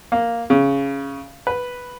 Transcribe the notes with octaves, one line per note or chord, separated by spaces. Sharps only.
A#3
C#3
B4